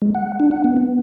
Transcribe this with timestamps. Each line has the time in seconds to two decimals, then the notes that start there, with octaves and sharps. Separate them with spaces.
0.02 G#3
0.15 F#5
0.40 D4
0.51 F#5
0.64 B3
0.77 B3